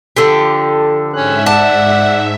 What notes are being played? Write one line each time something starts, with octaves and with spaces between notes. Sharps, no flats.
D3 F3 G4 A4
G#2 C#4 E5 F#6
D5 F#5 A5